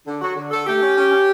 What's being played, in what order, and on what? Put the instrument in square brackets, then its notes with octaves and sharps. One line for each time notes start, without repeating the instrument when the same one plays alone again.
[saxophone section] D3
F#3 F#4
D3
D3 A4
A3 G4
C#4
C#4
C#4